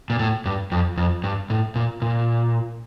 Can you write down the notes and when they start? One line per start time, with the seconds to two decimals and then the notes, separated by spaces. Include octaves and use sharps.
0.10 A#2
0.19 A2
0.45 G2
0.72 F2
0.97 F2
1.24 G2
1.50 A2
1.75 A#2
2.02 A#2